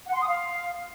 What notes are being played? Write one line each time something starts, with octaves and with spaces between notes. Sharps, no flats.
F#5
C6
D#6
F5